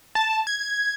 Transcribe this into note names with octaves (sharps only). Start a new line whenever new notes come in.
A5
G#6